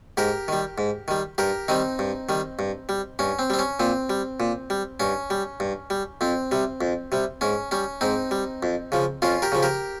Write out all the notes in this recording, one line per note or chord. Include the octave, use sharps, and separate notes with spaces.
G#2 G4 A#4
D#3 G3
G#2
D#3 G3
G2 G4 A#4
D#3 G3 C4 D#4
G2
D#3 G3
G2
G3
G2 C#4
C4
G3 C4
C#4
A#2 C4
G3
A#2
G3
G2 C#4
G3
G2
G3
F2 C4
C3 G3
F2
C3 G3
G#2 C#4
G3 C#4
G#2 C4 D#4
G3
F2
C#3 F3
F2 C#4 F4
G4 A#4
C#3 F3
G4 A#4